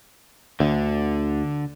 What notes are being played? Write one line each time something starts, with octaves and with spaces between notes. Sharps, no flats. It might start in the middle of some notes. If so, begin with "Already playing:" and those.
D2 D3